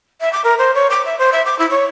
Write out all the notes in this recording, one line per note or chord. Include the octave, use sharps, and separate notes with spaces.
E5
D6
A#4
C5
C#5
D6
E5
C5
E5
D6
E4
C#5